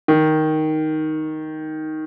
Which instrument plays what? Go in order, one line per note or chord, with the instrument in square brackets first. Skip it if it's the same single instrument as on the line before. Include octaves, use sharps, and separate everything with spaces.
[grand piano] D#3